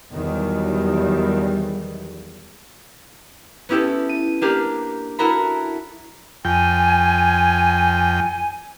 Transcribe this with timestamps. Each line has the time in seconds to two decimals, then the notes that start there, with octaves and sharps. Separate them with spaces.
0.13 E2 D#3 F#3 G3
3.69 B3 C#4 E4 G4 A4
4.09 D#7
4.42 A#3 D4 G4 A#4
5.19 E4 F#4 A4 A#4 A#5 B5
6.45 F2 G5 G#5